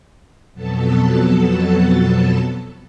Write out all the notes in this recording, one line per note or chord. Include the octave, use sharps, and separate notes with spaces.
F2 B2 F#3 B3 A4 A5